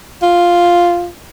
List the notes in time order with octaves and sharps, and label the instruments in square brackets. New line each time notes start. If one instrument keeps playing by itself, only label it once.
[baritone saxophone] F4